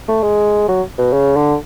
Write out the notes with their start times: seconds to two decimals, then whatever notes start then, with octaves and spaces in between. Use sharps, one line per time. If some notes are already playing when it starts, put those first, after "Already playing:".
0.08 A3
0.23 G#3
0.68 F#3
0.98 B2
1.13 C#3
1.36 D3